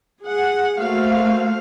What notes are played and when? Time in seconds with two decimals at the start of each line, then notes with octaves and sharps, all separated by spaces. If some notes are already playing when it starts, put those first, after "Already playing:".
0.23 G#4 F#5
0.79 A3 A#3 F#4 C5 F5